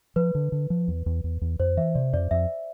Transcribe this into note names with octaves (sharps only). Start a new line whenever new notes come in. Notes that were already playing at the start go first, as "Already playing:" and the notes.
F3 B4
D3
D3
F3
E2
E2
E2
E2
F2 C5
E3 E5
C3 D5
F2 D5
F2 E5